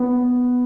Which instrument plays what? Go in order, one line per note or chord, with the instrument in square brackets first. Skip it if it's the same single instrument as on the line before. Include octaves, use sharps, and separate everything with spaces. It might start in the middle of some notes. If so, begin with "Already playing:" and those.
Already playing: [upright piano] B3